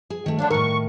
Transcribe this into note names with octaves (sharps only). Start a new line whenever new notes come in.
G#4
D#3 A3
D3 A3 D4 C#5 F5
A2 D#3 A#4 C#6